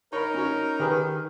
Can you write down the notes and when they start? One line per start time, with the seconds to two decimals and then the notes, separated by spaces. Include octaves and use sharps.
0.13 D#4 A#4 C#5 B5
0.34 C#4 F#4 C#5
0.80 D#3 G4 G#4 B4